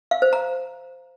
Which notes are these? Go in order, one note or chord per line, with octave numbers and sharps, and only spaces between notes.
F5
C5
A#5